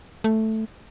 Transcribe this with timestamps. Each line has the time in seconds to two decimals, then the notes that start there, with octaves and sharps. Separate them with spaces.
0.24 A3